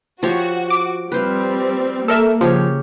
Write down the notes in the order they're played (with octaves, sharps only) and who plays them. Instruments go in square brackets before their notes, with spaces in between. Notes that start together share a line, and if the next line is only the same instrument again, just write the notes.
[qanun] F3 G4 C#5 [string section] F#4
[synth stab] D6
[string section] G3 C4 [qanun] B4 C5 F5
[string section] A#3 [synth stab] A4 A#4 E5
[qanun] C#3 G4 C#5 [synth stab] F3